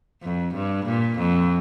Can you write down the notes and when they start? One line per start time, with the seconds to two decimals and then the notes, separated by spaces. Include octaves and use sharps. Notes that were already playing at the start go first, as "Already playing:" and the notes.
0.23 F2
0.55 G2
0.86 A#2
1.18 F2